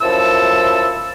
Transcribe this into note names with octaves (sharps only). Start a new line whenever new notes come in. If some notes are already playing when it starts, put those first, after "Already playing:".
F#2 F3 E4 A4 E6